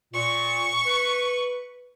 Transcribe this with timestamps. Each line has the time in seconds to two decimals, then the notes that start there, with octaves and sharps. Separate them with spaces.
0.14 A#2 C#6
0.86 B4